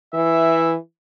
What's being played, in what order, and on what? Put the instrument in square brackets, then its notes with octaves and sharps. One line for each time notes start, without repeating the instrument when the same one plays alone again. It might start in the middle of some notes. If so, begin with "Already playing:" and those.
[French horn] E3 [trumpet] E5